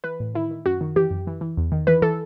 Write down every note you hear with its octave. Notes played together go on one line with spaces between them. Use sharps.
E3 B4
A2
D#3 E4
D#3
F#2 F#4
D#3
E3 G4
F#2
E3
E3
E2
D#3
E3 B4
E3 A4